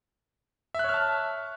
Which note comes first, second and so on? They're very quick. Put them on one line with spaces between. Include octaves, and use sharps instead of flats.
E5 F#6 C#5 F6 A5